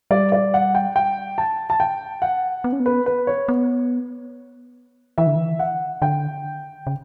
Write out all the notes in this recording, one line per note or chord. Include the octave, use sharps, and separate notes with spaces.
G3 D5
D5
F#5
G5
G5
A5
A5
G5
F#5
B3
C#4
B3
B4
B4
C#5
B3
E3 E5
D3
E3
F#5
D3 G5
C#3